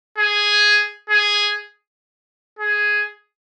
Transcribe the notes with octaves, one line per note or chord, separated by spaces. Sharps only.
G#4
G#4
G#4